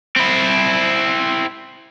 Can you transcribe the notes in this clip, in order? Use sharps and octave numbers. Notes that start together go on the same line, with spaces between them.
C4 E4